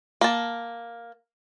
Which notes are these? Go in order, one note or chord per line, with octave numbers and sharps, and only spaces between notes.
A#3 A5